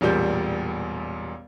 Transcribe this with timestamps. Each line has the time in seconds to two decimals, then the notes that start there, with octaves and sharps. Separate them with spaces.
0.01 E1 A1 A#2 G3 G6